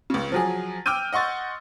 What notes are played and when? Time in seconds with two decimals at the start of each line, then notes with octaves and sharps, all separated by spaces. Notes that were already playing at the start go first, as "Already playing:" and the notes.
0.10 C#2 C#3
0.32 F3 F#3 G#4
0.86 G5 D6 E6 F6 G6 D#7
1.13 D#5 F#5 C6 C#6 A6